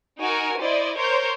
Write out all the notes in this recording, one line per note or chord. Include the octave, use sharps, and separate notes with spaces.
D#4 F#4 A#4 G#5
E4 C5 D5 D#5
A#4 C5 C#5 G6